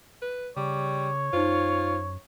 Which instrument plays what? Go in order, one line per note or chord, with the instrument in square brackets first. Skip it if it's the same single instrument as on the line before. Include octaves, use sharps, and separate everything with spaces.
[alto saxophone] B4
[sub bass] C#3 [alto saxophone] G3 [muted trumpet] C#5 [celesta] D6
[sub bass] F#2 [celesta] D#4 C5 [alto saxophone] F4